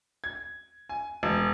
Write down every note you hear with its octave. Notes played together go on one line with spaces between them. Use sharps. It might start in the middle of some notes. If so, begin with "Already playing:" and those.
G#6
G#5
E1